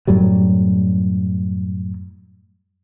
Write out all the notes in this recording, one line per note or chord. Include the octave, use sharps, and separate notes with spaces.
F#2 A2 F#3 G3